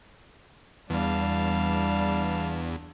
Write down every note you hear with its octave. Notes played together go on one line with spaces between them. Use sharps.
E2 G3 D4 F5